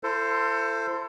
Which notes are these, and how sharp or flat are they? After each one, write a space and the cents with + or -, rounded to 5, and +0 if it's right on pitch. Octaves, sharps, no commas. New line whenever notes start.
E4 +40 A4 +25 C5 +0